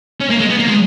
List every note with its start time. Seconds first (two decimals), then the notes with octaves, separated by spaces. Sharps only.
0.20 C#4
0.30 A#3
0.39 G#3
0.49 B3
0.59 A#3
0.68 G#3